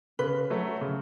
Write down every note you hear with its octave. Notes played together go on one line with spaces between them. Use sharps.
C#3 B4
F#3 A3
C#3